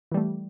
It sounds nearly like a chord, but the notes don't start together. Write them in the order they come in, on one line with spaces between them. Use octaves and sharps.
E3 G3 A3